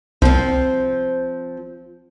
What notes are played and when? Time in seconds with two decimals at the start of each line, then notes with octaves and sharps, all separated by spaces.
0.22 C2 F3 C4